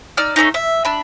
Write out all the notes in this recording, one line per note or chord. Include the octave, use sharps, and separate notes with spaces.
D#4 D5 E6 F6
A3 B3 C#4 D#4
E5
D4 B5